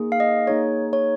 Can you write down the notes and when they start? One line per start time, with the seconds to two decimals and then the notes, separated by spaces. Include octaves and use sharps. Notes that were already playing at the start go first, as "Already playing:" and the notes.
Already playing: A#3 D#4 G#4
0.12 F5
0.20 D#5
0.47 A#3 D#4 G#4 C#5
0.93 C#5